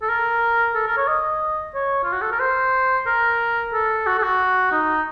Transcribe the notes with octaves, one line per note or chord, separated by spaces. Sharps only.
A4
A#4
A4
A#4
C#5
D#5
C#5
F4
F#4
A4
A#4
C5
A#4
A4
F#4
A4
F#4
D#4